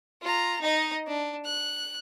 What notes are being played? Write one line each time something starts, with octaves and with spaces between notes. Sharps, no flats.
F4 A#5
D#4 D#5
D4
F#6